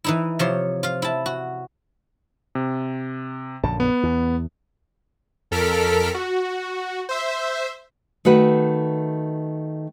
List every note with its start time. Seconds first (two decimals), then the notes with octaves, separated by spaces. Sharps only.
0.04 E3 D#4 E4
0.39 C3 F3 C#5 C6
0.83 F4 F5
1.02 E4 A5
1.26 F#4
2.55 C3
3.64 A#1 F#2 D3 A5
3.80 B3
4.03 E2
5.51 F2 A4 A#4 F6 B6 D7
6.14 F#4
7.09 C5 E5
8.25 D#3 A3 F#4 B4